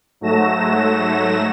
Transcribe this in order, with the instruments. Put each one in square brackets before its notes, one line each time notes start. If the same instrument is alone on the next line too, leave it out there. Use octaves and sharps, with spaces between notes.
[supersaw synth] G#2 F#3 A3 A#6 E7